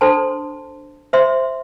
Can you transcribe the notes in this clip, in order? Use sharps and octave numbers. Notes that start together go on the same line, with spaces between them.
D4 A4 C5 A5 C6
C5 E5 C6